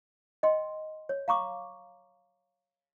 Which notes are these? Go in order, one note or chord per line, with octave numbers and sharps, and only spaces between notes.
D#5 G5 C6
C#5
F5 A#5 C#6 D6